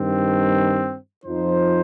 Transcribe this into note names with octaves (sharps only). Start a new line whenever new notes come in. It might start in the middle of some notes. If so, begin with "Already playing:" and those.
Already playing: G2 D#3 C4
F2 F3 D#4 C5